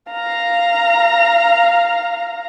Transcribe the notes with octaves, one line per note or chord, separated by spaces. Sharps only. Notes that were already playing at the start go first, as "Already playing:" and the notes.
F5 A#5